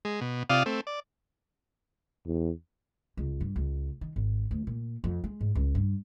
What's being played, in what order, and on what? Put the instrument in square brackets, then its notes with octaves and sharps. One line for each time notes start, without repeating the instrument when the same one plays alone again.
[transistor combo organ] G#3
B2
C3 F4 D5 F5 D#6
A3 C4
D5
[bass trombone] E2
[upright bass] C#2
G2
C#2
D#3
G#1
D2
A#2
F2
G#3
G#2
C#2
G2